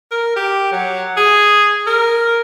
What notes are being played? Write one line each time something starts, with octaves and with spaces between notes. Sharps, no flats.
A#4
G4
F#3
G#4
A#4